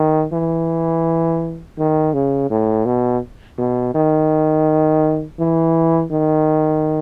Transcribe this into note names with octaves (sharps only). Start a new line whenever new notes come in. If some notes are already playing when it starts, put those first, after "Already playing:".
Already playing: D#3
E3
D#3
C#3
A2
B2
B2
D#3
E3
D#3